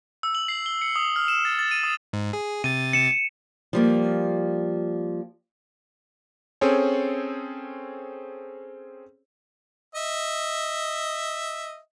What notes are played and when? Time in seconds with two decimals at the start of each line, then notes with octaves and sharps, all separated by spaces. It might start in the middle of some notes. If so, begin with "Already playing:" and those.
0.23 E6
0.35 F#7
0.48 C7
0.66 G7
0.82 C#7
0.96 D#6
1.16 F6
1.28 E7
1.45 A6
1.59 A6
1.71 D#7
1.83 D#6
2.13 G#2
2.33 G#4
2.64 C3 A6 D#7
2.93 C#7 E7
3.73 F3 G3 A#3
6.61 C4 C#4 G#4 A4 C5 C#5
9.95 D#5 E5